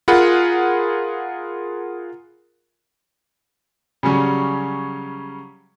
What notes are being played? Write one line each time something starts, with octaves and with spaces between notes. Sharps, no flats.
F4 G#4 A#4 F#5 B5
C#3 F#3 G3 C#4